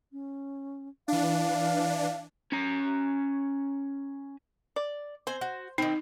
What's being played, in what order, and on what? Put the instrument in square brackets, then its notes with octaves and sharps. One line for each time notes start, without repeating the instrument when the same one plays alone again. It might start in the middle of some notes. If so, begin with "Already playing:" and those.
[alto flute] C#4
[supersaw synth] E3 D4 [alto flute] F5
[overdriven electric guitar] C#4 A#5
[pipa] D5
[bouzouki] C4 G#5 [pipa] C5
[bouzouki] F#4
[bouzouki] D#3 C4 [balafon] D#4